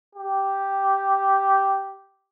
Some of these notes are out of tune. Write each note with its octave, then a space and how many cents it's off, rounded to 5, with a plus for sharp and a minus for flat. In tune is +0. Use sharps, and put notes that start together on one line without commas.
G4 -5